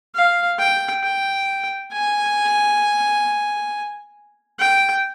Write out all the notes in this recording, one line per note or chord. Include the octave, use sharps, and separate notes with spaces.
F5
G5
G5
G#5
G5